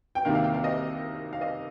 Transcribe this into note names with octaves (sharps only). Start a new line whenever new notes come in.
G5
C2 C3 D#3 A#3 F5
F5
G5
F5
D#5
F5
D#5